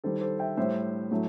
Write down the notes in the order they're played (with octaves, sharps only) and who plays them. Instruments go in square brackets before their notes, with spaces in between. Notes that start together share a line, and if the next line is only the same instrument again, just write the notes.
[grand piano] D#3 G3 A4 C5
A4 C5
E5 G5
A2 G3 C5 E5
A2 F#3 A3